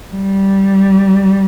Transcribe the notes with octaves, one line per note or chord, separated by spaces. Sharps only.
G3